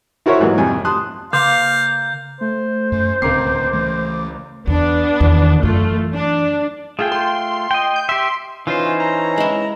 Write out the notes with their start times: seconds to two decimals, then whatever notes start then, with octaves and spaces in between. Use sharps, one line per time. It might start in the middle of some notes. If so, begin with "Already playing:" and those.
0.26 E4 F#4 A#4 C5 C#5 E5
0.40 G#2 E3 F#3 A#3 D#4 E4
0.58 C2 F2 G#5
0.85 A5 C6 D#6 F#6
1.33 C#3 A#3 F5 C6 G6
2.41 A3 C5
2.92 F#2
3.22 D1 C#2 C4 A#4 D6 C7
3.73 E3 A3
4.67 E2 B3 D4
5.20 E2 D#3
5.63 F#2 E3 A3 F4
6.15 D4
6.99 A3 F4 G#4 G5
7.12 C6
7.71 D#5 G5
7.96 G6
8.09 G4 E5 C6
8.67 E3 C#4 D#4 F4 B4 C5
9.00 A#5
9.38 G#3 E4